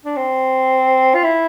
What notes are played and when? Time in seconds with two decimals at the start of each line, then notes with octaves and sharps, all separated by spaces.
0.05 D4
0.16 C4
1.14 F4
1.24 E4